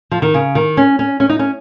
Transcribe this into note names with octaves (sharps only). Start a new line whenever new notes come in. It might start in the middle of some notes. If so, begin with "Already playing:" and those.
F3
D#3
C#3
D#3
C#4
C#4
C#4
D#4
C#4